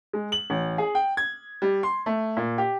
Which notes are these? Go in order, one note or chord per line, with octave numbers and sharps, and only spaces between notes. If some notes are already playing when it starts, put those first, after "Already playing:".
G#3
F#7
A1
G#4
G5
G#6
G3
C6
A3
A#2
G4